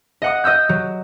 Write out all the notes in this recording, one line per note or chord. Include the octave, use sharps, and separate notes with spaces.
D#5 F#5 D#6
D#5 D#6 E6 G6
F#3